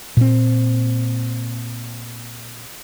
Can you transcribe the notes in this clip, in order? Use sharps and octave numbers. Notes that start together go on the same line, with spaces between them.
A#2 C4